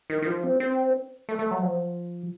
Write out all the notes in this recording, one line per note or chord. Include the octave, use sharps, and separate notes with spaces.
D#3
D#3
F3
C4
C4
A3
A3
F#3
F3